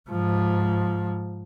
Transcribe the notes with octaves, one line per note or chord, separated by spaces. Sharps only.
G#2 F3